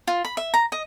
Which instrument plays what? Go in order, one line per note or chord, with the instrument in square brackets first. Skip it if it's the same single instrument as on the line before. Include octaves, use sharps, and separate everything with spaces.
[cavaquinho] F4
B5
E5
A#5
D#5